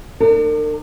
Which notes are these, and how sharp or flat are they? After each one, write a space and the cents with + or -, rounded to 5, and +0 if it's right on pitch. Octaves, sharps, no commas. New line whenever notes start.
D4 +40 A#4 -40